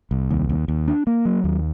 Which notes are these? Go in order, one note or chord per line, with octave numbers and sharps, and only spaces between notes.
C2
D#2
D#2
D#2
D4
A#3
F#3
D#2